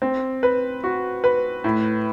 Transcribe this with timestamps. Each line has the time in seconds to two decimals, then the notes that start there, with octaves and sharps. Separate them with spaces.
0.02 C4
0.43 B4
0.84 F#4
1.24 B4
1.64 A2